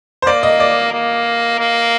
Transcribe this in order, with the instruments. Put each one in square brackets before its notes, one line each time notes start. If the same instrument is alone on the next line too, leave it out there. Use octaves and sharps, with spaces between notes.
[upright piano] C5
[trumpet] A#3 [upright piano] D5
[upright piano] D#5
D5
[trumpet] A#3
A#3